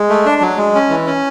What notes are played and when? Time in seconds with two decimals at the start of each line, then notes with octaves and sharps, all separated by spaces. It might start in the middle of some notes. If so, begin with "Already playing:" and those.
Already playing: G#3
0.10 A3
0.26 D4
0.41 F#3
0.57 G#3
0.75 C#4
0.90 E3
1.06 C#4